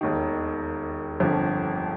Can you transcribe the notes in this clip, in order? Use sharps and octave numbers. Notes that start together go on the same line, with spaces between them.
E1 D#2 D#3
G1 F2 D3 F3